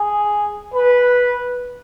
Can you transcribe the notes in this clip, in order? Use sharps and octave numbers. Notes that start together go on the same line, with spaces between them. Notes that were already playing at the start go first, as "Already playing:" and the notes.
Already playing: G#4
B4